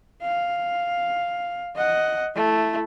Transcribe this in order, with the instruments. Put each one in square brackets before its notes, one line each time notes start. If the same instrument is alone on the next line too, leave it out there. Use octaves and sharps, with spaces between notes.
[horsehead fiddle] F5
D#5 F#5
A3 E4